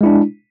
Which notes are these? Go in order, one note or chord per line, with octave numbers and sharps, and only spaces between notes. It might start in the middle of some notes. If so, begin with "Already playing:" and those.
G#3 D4 E4